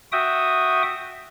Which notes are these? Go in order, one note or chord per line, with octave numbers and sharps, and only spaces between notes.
F#4 E5 G5 D#6